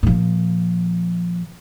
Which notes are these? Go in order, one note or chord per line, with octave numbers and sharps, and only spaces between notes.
A#2 F3